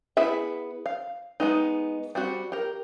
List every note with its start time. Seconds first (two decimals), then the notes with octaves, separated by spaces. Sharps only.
0.17 B3 E4 G#4 E5
0.86 F5
1.40 G#3 B3 D#4
2.15 G3 C4 F#4
2.52 G4 A#4